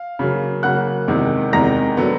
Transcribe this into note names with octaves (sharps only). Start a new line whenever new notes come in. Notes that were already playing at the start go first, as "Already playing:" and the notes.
Already playing: F5
C#3 F#3 A#3
C#3 F#3 A#3 F#5 F#6
E2 C3 D#3 G#3
E2 C3 D#3 G#3 A#5 A#6
D3 F#3 B3